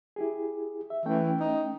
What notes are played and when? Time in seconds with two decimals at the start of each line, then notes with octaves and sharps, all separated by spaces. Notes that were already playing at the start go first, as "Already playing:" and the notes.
0.16 E4 G4 G#4
0.90 E5
1.06 E3 A3 C#4 G5
1.40 D#4